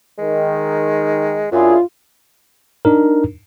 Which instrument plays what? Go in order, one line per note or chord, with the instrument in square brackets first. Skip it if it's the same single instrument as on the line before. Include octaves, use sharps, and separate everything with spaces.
[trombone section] D#3 [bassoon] G#3
[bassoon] F#2 [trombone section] D4 E4 G#4 [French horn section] F4
[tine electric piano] D4 D#4 A#4